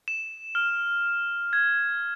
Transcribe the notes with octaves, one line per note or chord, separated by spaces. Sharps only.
E7
F6
G#6